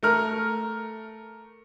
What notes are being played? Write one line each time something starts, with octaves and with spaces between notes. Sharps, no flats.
A3 A#4 F6